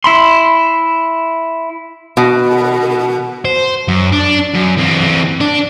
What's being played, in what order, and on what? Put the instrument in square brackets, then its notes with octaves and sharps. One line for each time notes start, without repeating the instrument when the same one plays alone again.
[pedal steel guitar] E4 B5 C6
[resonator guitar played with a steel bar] B2
[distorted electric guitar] C5
F#2
D4
F#2
E3 C4
D4